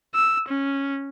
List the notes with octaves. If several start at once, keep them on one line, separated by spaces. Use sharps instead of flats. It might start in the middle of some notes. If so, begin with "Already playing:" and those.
E6
C#4